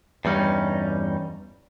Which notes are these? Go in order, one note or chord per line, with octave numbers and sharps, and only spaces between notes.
E2 G2 G3 C#4 D#4